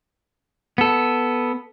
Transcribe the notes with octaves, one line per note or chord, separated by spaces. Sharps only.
B3 A4